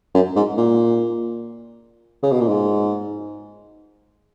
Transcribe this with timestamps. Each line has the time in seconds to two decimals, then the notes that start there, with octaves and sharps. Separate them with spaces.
0.15 F#2
0.36 G#2
0.57 A#2
2.23 C#3
2.32 B2
2.41 A#2
2.48 G#2